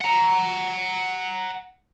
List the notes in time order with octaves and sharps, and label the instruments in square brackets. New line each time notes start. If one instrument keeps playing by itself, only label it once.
[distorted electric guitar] F#5 A#5